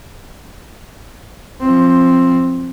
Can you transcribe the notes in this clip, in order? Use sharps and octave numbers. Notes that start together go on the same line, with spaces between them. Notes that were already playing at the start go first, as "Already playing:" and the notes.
F3 C4